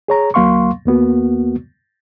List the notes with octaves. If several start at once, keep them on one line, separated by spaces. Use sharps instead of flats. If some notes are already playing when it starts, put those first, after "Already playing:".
G#4 C#5 A#5
D2 F#3 A#3 F5 C6 C#6
D#2 A#3 B3 F#4